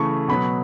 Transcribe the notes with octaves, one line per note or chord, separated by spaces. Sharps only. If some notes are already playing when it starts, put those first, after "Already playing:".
Already playing: C#3 E3 A3 C#6
B2 F#3 B3 B5